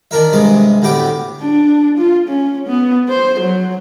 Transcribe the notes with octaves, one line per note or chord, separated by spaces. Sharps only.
D#3 D4 A#4 E5
G2 C3 G#3 D#6
D2 A2 B3 G4 D6
D4
F4
C#4
B3
C5
F#3